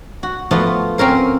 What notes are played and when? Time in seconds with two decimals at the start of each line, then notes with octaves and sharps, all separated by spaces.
0.23 F#4
0.51 F3 A3 B3 F4 F#4
0.98 C4 C#4 A#4 C5